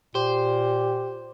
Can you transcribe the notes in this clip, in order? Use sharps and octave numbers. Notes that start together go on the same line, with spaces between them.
A#2 G4 C5